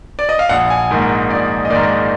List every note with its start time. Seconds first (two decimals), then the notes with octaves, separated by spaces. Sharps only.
0.19 D5
0.29 D#5
0.39 F5
0.49 A#1 F#5
0.70 G#5
0.91 G#2 D#3 A#3
1.31 A#1 D5
1.65 D#5
1.70 G#2 D#3 A#3 D5